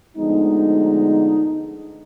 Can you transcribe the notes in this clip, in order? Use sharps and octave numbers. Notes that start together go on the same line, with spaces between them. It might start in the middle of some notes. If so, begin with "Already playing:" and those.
D2 D3 F3 G#3 B3 D#4